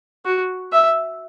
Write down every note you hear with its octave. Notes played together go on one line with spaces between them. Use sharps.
F#4
E5